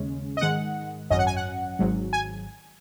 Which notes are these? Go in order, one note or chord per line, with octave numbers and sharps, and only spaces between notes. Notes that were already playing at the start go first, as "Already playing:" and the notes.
Already playing: D#2 C#3 G#3 C#4
D#5
G#2 D#3 G#3 F#5
G#1 F#2 F#3 C#4 D#5
F#5
G#5
F#5
G#1 G#2 F#3
G#5